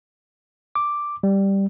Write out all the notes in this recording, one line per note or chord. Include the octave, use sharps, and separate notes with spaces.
D6
G3